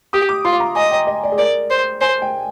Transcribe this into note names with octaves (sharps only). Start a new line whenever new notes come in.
G4 D#6
D6
F4 C6
A#5
D#5 G#5
G5
D#5
D5
G#4
A#4 D5
C5
C5 G#5
G5